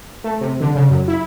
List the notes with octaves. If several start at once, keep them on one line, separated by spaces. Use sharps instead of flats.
A3
C3
D3
C#3
F#2
E4